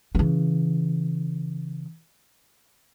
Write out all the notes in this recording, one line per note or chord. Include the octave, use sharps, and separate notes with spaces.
C#3 E3